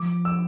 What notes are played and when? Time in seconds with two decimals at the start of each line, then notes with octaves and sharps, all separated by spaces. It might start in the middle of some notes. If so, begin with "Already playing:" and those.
Already playing: F3 D6
0.25 E6